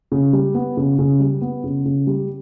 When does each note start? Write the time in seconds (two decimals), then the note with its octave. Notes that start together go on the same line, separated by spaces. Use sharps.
0.12 C#3
0.33 G3
0.54 B3
0.77 C#3
0.99 C#3
1.20 G3
1.41 B3
1.64 C#3
1.85 C#3
2.07 G3